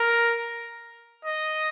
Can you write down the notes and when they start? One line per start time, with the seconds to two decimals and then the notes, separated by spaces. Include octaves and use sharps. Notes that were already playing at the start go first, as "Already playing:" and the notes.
Already playing: A#4
1.25 D#5